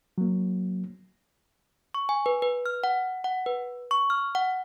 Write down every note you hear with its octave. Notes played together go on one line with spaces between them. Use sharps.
F#3 A#3
C#6
G#5
B4
B4
F6
F#5
F#5
B4
C#6
F6
F#5